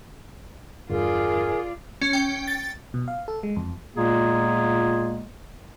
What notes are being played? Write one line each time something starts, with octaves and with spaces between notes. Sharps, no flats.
E2 G2 D3 F4 G#4 A#4 D5
C#4
G5
A6
B2
F5
A4
G#3
F2
A#2 G#3 A#3 B3 F4 G#4